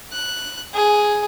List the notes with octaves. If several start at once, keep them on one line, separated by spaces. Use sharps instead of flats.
F#6
G#4